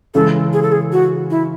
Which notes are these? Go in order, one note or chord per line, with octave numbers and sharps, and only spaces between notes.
C#3 E3 G#3 A4
G#4
A4
G#4
F#4
E4